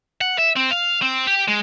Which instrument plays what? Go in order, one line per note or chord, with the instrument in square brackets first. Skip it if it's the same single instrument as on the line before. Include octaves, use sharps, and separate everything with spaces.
[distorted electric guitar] F#5
E5
C4
F5
C4
G4
G#3